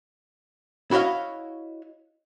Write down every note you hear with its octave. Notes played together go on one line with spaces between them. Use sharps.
E4 F#4 C#5 D#5 F5